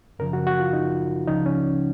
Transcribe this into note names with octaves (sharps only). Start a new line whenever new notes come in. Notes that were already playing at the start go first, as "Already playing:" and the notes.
F#2 C#3 F3 A#4
F#4
F#4
F4
D#4
C#2 C#3 F3 D#4
C#4